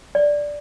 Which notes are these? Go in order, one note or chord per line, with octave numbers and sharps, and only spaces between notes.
D5